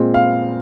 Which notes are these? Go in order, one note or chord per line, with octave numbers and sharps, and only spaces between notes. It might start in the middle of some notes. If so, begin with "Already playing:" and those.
Already playing: A#2 G#3 C4
F5